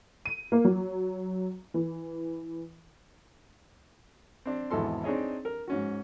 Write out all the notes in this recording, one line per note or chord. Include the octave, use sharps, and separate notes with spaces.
D#7
A#3
F#3
E3
C4 D4
G#1 E2 B2 A4 C6
C4 D4 D#4 G#4 C#5 D#5
A#4
G#2 C#4 F#4